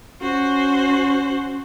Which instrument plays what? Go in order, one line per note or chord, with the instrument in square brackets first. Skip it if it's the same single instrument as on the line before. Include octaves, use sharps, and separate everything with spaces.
[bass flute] C#4 [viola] F#4 C5